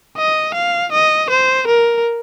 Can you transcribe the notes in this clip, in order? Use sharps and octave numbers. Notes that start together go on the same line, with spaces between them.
D#5
F5
D#5
C5
A#4